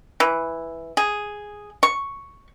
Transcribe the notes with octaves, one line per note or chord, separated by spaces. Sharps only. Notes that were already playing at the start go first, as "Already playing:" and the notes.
E3
G#4
C#6